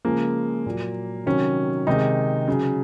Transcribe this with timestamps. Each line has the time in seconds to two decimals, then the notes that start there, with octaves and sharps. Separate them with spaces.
0.05 C#3 F3 G#3 A#3
0.66 A#2 F#3
1.26 C3 D#3 F#3 C#4
1.87 C3 D#3 G#3 D#4
2.48 C#3 F#3